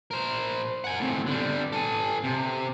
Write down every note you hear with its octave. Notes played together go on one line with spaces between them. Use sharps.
A#4 C5
F#5 G#5
A2 C4
D3 G3
A4 G#5
C3